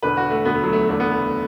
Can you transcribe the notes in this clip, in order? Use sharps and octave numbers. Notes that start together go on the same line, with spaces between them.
E1 E2 D3 B4
F#4
A3
E1 D2 D3 B3
A3
F#3
A3
F#1 E2 D3 A3
B3
A3